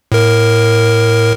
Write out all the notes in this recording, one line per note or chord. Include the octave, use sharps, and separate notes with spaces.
A2 A#4